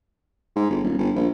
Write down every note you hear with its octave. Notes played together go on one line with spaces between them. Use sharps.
G#2
G1
D#1
G1
A#1